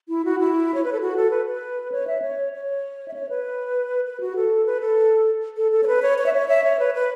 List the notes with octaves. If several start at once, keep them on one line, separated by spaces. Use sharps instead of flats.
E4
F#4
E4
C#5
B4
A4
F#4
A4
B4
B4
C#5
E5
C#5
C#5
E5
C#5
B4
B4
F#4
A4
B4
A4
A4
A4
C#5
B4
C#5
C#5
E5
C#5
E5
C#5
B4
B4